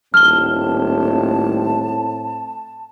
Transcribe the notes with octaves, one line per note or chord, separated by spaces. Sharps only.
D#1 A2 C4 A5 F6 G7